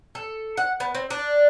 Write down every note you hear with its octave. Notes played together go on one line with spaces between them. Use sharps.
A4
F#5
B3
C4
D4